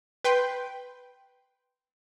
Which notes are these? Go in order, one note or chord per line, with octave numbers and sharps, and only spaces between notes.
B4 G5 C6